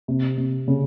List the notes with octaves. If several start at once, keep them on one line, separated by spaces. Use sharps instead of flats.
C3
C3
C#3